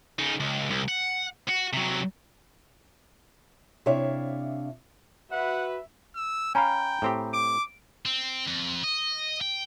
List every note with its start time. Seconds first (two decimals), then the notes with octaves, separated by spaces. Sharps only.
0.19 C#3 D#4
0.40 C#2
0.70 C2
0.88 F#5
1.49 F#4
1.73 C3 F#3
3.86 C3 D4 E4 C#5 E5 F5
5.31 F#4 B4 E5 F#5
6.16 E6
6.55 C#4 F5 G5 G#5 A#5 B5
7.02 A2 C4 G4
7.34 D6 D7
8.06 C4
8.47 F2
8.84 D#5
9.41 G5